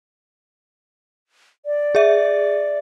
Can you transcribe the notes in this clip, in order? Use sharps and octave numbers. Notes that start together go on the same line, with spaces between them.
D5
G#4 E5